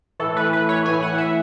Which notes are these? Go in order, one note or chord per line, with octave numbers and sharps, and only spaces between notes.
A2 E3 A4
B4
B4
C#5
A2 E3 G#5
F#5
E5